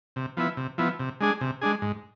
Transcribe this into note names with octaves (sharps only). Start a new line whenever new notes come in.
C3
F3 B3 E4
C3
F3 B3 E4
C3
G#3 D4 G#4
C3
G#3 D4 G#4
G#2